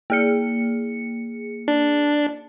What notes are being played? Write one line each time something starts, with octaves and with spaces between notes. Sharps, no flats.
A#3 G#4 C#7
D4